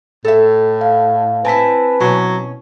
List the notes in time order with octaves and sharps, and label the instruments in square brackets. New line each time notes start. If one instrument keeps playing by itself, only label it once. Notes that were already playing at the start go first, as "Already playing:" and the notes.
[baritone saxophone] A2 [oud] A4 E5
[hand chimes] F5
[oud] C4 E4 [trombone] B4 [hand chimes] G#5 A5 B6
[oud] B2 C#4 [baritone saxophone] F#3